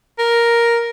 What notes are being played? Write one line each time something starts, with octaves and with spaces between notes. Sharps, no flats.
A#4